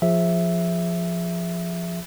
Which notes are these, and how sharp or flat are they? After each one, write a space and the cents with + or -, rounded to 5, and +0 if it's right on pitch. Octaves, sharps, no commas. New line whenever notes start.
F3 +0 G#4 +0 E5 +0